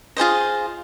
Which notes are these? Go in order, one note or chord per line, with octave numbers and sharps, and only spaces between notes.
F4 G#4 C5 D#5